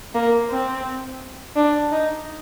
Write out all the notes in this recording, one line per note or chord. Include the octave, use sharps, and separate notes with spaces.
A#3
C4
D4
D#4